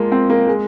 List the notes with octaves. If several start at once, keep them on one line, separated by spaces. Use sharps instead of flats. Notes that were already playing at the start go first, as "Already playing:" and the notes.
Already playing: F3 G#3 A#3
C4
A#3
G#3